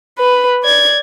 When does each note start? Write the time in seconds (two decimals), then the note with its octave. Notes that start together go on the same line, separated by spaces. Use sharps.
0.19 B4
0.64 D5 G#6